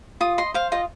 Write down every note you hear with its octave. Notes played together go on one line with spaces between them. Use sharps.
F4 D#6
D#5 C6
C5 F5
F4 D#5